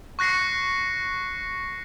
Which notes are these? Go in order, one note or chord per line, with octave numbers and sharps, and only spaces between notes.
C#6 F#6 A#6 C7 C#7